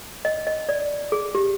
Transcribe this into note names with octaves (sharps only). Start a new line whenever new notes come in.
D#5
D#5
D5
G#4
G4